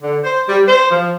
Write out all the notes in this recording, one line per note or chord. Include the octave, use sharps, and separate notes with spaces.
D3
C5
G3
C5
F3